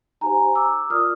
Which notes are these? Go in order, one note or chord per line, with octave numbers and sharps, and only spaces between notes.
D#4 G4 C5 G#5 A#5
D6 E6
F4 A#4 D5 D#6 F6